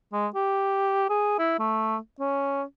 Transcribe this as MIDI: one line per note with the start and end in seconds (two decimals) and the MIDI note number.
0.13 0.28 56
0.35 1.08 67
1.10 1.35 68
1.39 1.55 64
1.59 1.97 57
2.20 2.63 61